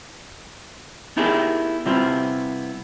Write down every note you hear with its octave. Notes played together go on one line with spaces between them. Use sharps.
B3 D#4 E4 G4 G#4 A#4
C3 G3 B3 C4 E4 F4